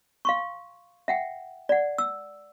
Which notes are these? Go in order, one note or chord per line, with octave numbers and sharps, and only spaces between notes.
F5 C6 C#6
E5 F#5 G5
D5 F#5
E6